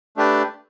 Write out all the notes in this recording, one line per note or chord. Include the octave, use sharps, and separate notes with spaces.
A3 D4 G4 B4 D5